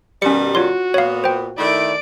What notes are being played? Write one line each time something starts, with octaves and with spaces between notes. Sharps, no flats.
B2 D#3 G3 C#4 C#7
F4 F#4 C#5 C6
A#2 B3 C#5 F5
C5 G5
D#3 A3 E4 D5 D7